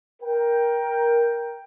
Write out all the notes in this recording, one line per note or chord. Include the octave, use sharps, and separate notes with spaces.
A#4 G5